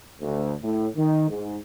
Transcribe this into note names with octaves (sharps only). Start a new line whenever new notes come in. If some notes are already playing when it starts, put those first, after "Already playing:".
D2
A2
D#3
G#2